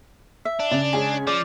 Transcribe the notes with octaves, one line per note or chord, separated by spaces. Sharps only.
E5
D4
C#3 D5 F7
G#3 C#4 G#4 G#5
F3 D5